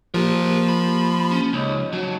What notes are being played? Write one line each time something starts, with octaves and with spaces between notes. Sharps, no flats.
F3 A#3 G4 A#4 C5
B5
C#4
C#2 D#4 C#5 D#5
F#3 F#4 A5